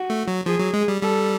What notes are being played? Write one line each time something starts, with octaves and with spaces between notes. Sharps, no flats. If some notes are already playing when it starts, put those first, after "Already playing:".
Already playing: F#4
A3
F#3
F3 G#4
F#3
G#3
G3
G3 A4